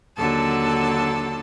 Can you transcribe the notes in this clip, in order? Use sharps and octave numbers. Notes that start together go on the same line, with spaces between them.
D#2 D3 F#3 A4 A5